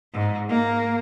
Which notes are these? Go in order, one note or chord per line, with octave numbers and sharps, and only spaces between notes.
G#2
A#3